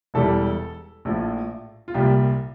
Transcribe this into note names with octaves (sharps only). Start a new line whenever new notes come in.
E1 E2 E3 G3 A4
A#1 A2 F3
F4
C2 A#2 G3 G4